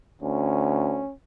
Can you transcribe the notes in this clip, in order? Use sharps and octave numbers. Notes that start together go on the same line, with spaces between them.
D2 C#4